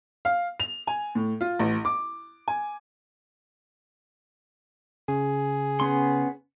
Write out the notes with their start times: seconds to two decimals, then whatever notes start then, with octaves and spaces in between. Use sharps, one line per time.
0.25 F5
0.60 F7
0.87 G#5
1.15 A2
1.41 F4
1.59 A1
1.85 D6
2.48 G#5
5.09 C#3 G#4
5.80 B3 C#4 C6